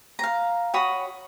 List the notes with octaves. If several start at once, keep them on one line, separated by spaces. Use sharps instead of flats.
F5 A#5
F#4 C#5 B5 D#6